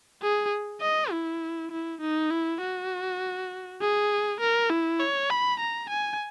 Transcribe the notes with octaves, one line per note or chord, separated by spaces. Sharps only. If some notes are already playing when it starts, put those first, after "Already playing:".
G#4
D#5
E4
E4
D#4
E4
F#4
G#4
A#4
E4
C#5
B5
A#5
G#5